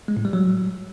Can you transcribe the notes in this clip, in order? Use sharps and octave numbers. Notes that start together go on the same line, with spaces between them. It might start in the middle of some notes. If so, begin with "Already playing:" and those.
G#3
A2
G3
F#3